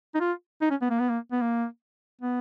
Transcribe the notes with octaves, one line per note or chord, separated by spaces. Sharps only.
D#4
F4
D#4
C#4
B3
A#3
B3
A#3
B3
A#3
B3